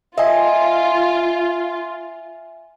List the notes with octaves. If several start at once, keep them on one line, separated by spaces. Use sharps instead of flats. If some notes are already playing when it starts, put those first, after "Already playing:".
F4 D#5 E5 G#5